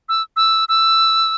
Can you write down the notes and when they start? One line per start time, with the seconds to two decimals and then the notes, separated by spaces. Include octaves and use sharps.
0.09 E6
0.36 E6
0.69 E6